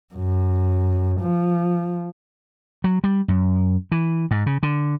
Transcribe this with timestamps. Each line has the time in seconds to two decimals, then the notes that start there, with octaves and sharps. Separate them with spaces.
0.14 F#2
1.21 F3
2.84 F#3
3.04 G3
3.28 F#2
3.92 E3
4.31 G#2
4.46 C#3
4.63 D3